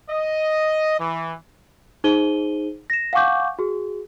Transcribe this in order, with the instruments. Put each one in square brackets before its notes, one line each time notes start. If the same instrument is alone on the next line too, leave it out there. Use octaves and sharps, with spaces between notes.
[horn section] D#5
E3
[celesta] D#4 G#4 C5 D#7 G7
A#6 E7
F5 F#5 G#5 C#6 D6 G6
F#4 G#4